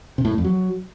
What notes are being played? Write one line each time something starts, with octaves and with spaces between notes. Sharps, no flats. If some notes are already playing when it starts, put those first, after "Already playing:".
C3
A2
G#2
F2
F#3